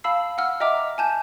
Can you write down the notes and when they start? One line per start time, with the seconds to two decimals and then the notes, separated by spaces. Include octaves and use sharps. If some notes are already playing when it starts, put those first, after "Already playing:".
0.04 F5 A5 B5 E6 C7
0.38 F#5 E6 F6
0.60 D#5 E5 G5 A#5 D6 F6
0.98 G#5 A5 G6